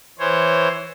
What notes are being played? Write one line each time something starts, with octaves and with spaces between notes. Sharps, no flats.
E3 C5 C#5